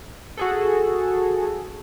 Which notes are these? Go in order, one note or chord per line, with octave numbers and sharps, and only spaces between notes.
F#4 G#4 A4